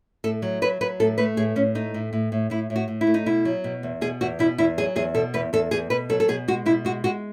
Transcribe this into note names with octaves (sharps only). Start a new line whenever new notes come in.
A2 A4
F#3
F#3 B4
F#3 B4
A2 A4
A3 B4
A2 G#4
A2 C#4
A3 D#4
A2
A2
A2
A2 E4
A2
F#4
A2
E4
A3
D#4
B2 E4
F#3
B2
E2
B2 G#4
E2 F#4
B2 E4
E2 E4
F#3 G#4
E2 G#4
B2 A4
E2 B4
E2 A4
E2 G#4
B2 B4
F#3 A4
A4
B2 G#4
G#3 F#4
B2 E4
G#3 F#4
G#3 F#4